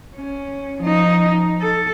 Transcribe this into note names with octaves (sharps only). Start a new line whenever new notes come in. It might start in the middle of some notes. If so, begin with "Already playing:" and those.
C#4
F3 D#4
A4